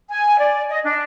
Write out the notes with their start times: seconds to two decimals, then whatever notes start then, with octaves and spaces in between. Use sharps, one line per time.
0.10 G#5
0.39 D5
0.70 D#5
0.85 D4